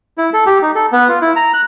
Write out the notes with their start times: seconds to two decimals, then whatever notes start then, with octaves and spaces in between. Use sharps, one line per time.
0.18 E4
0.34 A4
0.46 G4
0.62 D#4
0.75 A4
0.92 B3
1.08 F4
1.22 E4
1.36 A#5
1.54 F#6